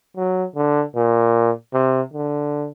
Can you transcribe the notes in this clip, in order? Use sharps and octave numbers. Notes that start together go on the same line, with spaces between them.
F#3
D3
A#2
C3
D3